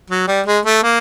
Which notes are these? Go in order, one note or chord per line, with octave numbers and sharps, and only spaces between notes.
F#3
G3
G#3
A3
A#3